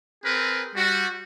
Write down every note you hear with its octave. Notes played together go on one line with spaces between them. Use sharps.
C4 G#4 A#4 B4
G3 F#4